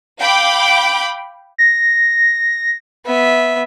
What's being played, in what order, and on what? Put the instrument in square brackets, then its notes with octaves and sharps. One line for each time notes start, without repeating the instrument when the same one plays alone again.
[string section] F5 G5 B5 D6
[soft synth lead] A#6
[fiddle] B3 E5